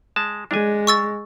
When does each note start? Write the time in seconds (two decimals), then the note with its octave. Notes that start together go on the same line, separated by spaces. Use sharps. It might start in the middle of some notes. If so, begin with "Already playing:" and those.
0.16 G#3 A5
0.51 G#3 D4 G#5
0.87 C#6 E6 A6